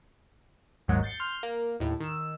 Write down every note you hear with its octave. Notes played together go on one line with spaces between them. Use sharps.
G#1 D#2 G#2 D#3 F#3 G#3
G6 A6 C7 C#7
C6 F6 G6
A#3
D#2 A2
D#3 E6